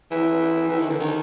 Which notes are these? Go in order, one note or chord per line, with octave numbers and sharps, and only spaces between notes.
E3
E3
D#3
D3
D#3